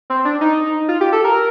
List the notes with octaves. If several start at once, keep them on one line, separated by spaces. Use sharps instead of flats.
C4
D4
D#4
F4
G4
A4
A#4